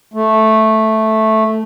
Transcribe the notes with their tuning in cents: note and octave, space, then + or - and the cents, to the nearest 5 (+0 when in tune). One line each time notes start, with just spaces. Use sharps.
A3 -5